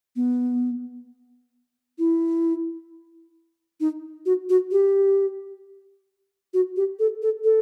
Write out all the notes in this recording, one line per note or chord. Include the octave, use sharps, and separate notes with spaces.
B3
E4
D#4
F#4
F#4
G4
F#4
G4
A4
A4
A4